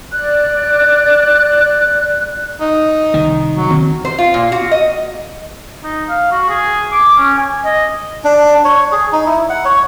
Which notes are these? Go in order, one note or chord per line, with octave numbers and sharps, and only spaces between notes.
D5 F#6
D#4
C2 D#3
F#3
D2 D#3 C4
C5
F4
A#2
F#4
D#5
D#4
F5
F#4
G#4
D6
C#4
G#5
D#5
D4
C#5
G#4
D#4
E4
F#5
C#5